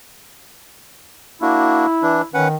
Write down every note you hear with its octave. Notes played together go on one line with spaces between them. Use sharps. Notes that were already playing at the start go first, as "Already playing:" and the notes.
A#3 D4 E4 F#4
E3 D4
D#3 C#4 B4 F#5